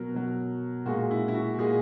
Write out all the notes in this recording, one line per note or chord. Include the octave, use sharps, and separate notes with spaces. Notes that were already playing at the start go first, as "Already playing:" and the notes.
Already playing: B2 F#3 A#4
B2 F#3
A#2 G#3 F#4
E4
E4
F#4
A#2 G#3 G#4